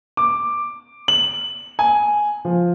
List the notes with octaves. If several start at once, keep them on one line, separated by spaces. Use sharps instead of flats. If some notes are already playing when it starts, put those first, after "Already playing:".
D6
F#7
G#5
F3